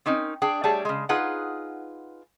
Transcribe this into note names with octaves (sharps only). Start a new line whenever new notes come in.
C4 C#4 D#4 A#4
D4 G#4 G5
G3 A3 G#4 C#5 D5 A5
C#3 G#3
D#4 F4 G#4 B4 F#5